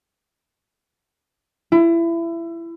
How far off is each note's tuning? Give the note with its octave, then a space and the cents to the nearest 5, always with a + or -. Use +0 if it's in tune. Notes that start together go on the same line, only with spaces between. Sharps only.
E4 +25